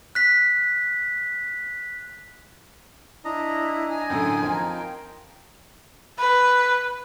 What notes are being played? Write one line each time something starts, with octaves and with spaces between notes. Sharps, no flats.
F#6 B6
D4 E4 D#5 A#5
G#5
F#2 A2 D3 G5 D#6
F2 D#4 F4 A#4
G5
B4